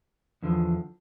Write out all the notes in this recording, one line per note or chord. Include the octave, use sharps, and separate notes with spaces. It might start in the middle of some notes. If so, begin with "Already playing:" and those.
E2 D3 F3